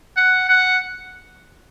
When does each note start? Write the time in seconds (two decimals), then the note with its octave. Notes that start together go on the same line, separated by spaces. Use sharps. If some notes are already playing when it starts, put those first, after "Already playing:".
0.17 F#5
0.49 F#5